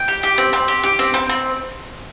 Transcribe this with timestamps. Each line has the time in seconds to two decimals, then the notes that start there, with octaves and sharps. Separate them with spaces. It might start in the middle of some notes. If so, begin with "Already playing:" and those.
Already playing: G5
0.08 G4
0.23 G4
0.38 C4
0.53 C4
0.68 G4
0.83 G4
0.99 C4
1.14 C4
1.29 C4